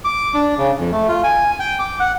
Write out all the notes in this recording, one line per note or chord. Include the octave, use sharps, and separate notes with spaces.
D6
D4
C#3
F2
A3
F4
G#5
G5
D6
F#5